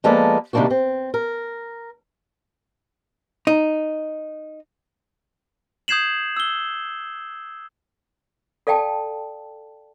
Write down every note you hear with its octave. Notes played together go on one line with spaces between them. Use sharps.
F3 G#3 A#3 B3 A4 D5
C3 D#3 G3 A#3 D4 F#4
C4
A#4
D#4
D#6 G6 G#6 C7 E7 F#7
E6 G7
A4 D5 F5 G5 A5